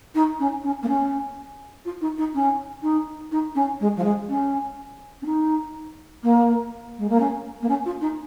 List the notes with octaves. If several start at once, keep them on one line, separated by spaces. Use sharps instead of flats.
D#4
C#4
C#4
A#3
C#4
F4
D#4
D#4
C#4
D#4
D#4
C#4
G#3
F3
G#3
C#4
C#4
D#4
A#3
G#3
A#3
C#4
A#3
C#4
F4
D#4